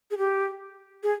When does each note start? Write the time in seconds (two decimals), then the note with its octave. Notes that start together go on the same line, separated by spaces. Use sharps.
0.11 G#4
0.18 G4
1.03 G#4